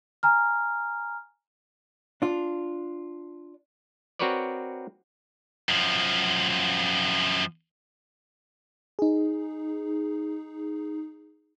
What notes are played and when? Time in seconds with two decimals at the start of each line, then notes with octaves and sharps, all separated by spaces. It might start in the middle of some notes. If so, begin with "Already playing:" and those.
0.23 G#5 A#5 F6
2.22 D4 F4
4.19 C4 F#4 A#4 B4 C#5 D5
5.69 F#2 F3
8.99 D#4 G#4